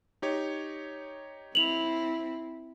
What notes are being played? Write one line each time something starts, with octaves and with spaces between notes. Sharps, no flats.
D#4 G4 C#5
C4 E4 F7 F#7